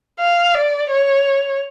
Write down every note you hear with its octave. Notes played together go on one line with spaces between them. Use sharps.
F5
D5
C#5